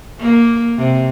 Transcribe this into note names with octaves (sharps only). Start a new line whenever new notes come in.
A#3
C3